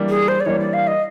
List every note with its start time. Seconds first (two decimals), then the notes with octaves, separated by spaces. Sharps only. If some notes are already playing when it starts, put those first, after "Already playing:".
Already playing: E3 G3 A#3 D4
0.09 G#4
0.28 C5
0.40 D5
0.46 E3 G3 A#3 D4 C#5
0.60 D5
0.73 F5
0.87 D#5